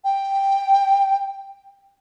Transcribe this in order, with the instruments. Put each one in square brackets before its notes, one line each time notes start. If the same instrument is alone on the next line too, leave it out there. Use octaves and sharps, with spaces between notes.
[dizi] G5